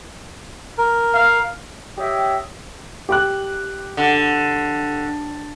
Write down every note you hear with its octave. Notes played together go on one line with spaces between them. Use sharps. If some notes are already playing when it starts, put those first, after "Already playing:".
A#4
F5
G4 C#5 D#5 E5 G5
G4 D6 F#6
D3